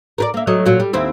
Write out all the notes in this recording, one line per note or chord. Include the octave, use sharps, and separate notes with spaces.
A#4 B4 D5
A#3 E5
F#3 A3 D#5
A#2 F#3
G3
D#2 C4 E4